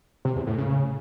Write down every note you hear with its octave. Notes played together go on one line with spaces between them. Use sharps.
C3
E2
A2
C#3